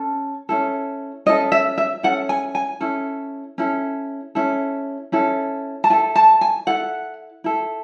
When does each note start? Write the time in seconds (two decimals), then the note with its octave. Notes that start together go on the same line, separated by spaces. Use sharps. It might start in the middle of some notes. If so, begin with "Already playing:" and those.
Already playing: C#4 A4
0.49 C#4 E4 A4
1.26 C#4 E4 A4 D#5
1.52 E5
1.78 E5
2.03 C#4 E4 A4 F#5
2.29 G#5
2.55 G#5
2.80 C#4 E4 A4
3.58 C#4 E4 A4
4.35 C#4 E4 A4
5.12 C#4 E4 A4
5.84 A5
5.90 E4 G#5
5.93 A4
6.16 A5
6.41 G#5
6.67 E4 A4 F#5
7.44 E4 A4